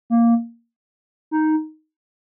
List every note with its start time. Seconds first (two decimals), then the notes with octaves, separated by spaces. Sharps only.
0.10 A#3
1.31 D#4